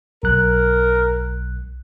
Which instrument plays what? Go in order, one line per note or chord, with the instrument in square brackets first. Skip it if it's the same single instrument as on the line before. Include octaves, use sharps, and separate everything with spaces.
[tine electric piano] B1 F#6 [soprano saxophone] A#4